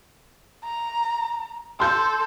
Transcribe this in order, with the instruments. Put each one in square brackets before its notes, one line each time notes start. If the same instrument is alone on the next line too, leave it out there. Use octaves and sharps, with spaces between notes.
[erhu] A#5
[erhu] A4 [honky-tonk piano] C6 G6